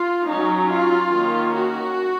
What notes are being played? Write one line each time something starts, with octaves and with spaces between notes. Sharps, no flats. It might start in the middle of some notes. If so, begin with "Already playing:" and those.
Already playing: F4
F#3 C#4 D#4
F4
D#3 A#3 C#4
F#4